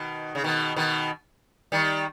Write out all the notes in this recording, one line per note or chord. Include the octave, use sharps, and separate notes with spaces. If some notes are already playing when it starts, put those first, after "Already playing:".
Already playing: B2 D#3
C#3
B2 D#3
B2 D#3
D#3 G3